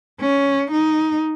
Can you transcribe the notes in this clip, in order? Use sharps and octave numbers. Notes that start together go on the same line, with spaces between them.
C#4
D#4